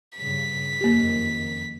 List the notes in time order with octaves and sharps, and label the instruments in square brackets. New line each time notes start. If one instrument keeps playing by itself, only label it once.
[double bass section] G2 C#3 [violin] B6
[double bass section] F#1 F2 D#3 [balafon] A#3 G4